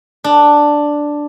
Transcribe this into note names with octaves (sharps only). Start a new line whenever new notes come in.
D4